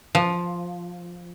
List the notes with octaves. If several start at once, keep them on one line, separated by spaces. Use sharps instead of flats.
F3